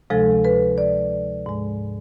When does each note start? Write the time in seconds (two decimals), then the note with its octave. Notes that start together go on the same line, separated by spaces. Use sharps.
0.10 D2 C3 F3 G#3 A4
0.45 B4
0.78 D5
1.46 G#2 G#3